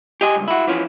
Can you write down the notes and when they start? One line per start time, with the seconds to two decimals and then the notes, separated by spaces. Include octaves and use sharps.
0.21 G4 D#5 G#5
0.36 C#2 G2
0.48 E4 F#4
0.67 E3 F3 C#4